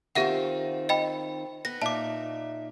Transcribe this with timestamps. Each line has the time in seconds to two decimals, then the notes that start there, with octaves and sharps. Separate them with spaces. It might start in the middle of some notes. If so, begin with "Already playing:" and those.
0.15 D#3 C4 F4 G4 E5 F#5
0.89 D#5 G5 B5
1.65 B3 A#6
1.82 A#2 D#4 E5 A5 D6